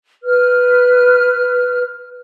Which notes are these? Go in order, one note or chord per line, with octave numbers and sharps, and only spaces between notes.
B4 F6